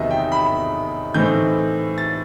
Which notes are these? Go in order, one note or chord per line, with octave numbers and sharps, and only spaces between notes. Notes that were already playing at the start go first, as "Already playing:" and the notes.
Already playing: E2 C3 D#3 F#3 B3 D#5 E5
G5
B5
A2 E3 A3 C4 D#4 G6
A6